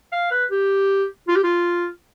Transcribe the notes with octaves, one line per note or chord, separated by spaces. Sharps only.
F5
B4
G4
F4
G4
F4